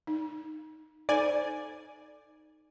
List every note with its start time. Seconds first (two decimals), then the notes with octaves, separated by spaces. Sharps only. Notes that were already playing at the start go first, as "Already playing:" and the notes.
0.07 D#4
1.09 D#4 A4 C5 D5 G#5